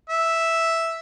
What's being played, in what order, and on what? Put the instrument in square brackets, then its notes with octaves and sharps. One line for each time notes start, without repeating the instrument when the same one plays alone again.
[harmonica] E5